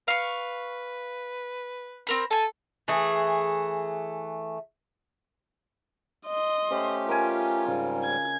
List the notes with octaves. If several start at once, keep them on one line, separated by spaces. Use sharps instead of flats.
B4 F5 C#6
C4 A#4 B5
A4 G#5 A5
E3 A3 G#4
D#5 C6
A3 C#4 G4 C5
F4 A#4 D#5 G#5
G#2 C#3 G3
G#6